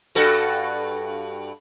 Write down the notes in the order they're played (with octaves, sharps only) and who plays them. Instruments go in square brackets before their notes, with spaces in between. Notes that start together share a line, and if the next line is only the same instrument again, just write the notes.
[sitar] G2 F#4 A4